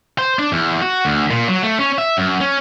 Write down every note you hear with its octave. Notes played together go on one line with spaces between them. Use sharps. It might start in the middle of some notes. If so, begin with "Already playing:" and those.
C5
D4
E2
F#4
D2
A#2
F#3
A3
C#4
E5
F#2
C#4